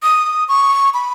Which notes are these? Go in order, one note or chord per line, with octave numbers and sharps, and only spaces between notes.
D#6
C#6
B5